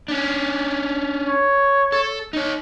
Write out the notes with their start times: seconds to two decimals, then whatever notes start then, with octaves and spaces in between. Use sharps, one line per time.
0.08 C#4 D4
1.24 C#5
1.92 A4
2.33 D#4 C#5